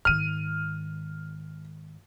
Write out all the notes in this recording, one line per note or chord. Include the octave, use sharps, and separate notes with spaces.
G#2 D#3 F6 D#7